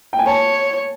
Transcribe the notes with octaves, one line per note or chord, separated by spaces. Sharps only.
G5
G#5
C#5 A5